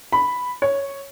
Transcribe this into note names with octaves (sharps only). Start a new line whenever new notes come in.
B5
C#5